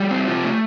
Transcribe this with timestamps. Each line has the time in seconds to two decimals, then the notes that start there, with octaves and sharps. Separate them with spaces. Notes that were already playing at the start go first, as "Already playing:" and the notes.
Already playing: G3 F#4 G#4
0.11 C4
0.27 C3 F4 G4
0.44 A3